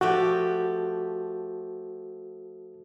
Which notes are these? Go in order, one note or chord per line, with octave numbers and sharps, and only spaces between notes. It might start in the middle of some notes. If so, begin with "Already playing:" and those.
F3 A3 F#4 G4